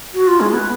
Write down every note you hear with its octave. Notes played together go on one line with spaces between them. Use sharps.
F#4
F4
G#3
B3